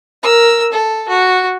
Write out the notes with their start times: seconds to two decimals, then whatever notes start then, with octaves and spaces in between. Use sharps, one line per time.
0.22 A#4 E6
0.72 A4
1.09 F#4